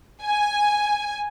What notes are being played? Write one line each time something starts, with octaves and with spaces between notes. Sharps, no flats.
G#5